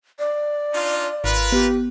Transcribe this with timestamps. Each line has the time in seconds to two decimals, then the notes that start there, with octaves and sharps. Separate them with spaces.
0.19 D5
0.74 D4 D#4 F4
1.24 G#1 F4 A#4 B4
1.52 B3 G4